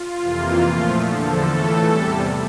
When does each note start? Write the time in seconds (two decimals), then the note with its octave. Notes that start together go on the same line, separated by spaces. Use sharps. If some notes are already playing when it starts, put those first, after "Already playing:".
Already playing: F4
0.21 F2 C3 E3 A#3
0.62 A#2 F3 A3
1.01 E2 D3 F3 A4
1.42 A2 E3 A3
1.83 E2 C3 G3